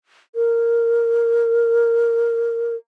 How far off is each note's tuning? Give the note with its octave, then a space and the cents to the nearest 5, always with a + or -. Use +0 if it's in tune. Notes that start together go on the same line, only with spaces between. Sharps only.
A#4 -5